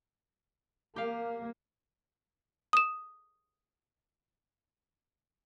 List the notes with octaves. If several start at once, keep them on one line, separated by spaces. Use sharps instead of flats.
A#3 G4 F5
D#6 E7